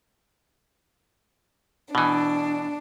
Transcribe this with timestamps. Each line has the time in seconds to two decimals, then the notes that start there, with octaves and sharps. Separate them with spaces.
1.95 B2 E3 D4